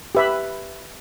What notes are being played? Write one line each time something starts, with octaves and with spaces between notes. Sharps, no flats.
G4 B4 E5 B5